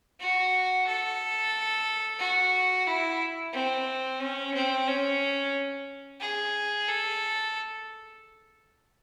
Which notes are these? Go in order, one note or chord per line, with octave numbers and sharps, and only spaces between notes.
F#4
A4
F#4
E4
C4
C#4
C4
C#4
G#4
A4